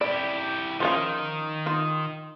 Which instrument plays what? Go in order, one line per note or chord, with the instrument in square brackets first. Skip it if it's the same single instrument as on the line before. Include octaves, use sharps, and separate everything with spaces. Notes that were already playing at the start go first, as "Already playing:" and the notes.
[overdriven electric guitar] E4 G4 [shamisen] D5
[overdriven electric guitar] D#3 [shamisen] F3 C#4 F4
[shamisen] D#4 F4